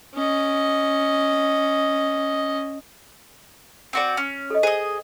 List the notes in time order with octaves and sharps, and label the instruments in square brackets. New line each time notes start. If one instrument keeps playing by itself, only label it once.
[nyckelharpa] C#4 D#5
[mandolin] C4 F#4 D5
C#4
[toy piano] A4 D#5
[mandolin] G#4 D#5 [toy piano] C5